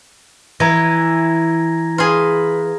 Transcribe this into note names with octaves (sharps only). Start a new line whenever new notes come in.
E3 A#5 G#6 A#6
F4 G#4 B4